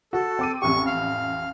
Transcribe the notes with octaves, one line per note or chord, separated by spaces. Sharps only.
F#4 A4
C4 D6 D#7
A1 F2 G4 C#6
F5